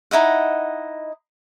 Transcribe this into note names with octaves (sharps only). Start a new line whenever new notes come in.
D#4 E4 D#5 F#5